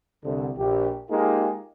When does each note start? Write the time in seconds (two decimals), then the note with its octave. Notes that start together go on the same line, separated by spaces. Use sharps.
0.24 C2 D3
0.57 A#1 G4
1.11 G#3 A#3 D#4 F4 G4 G#4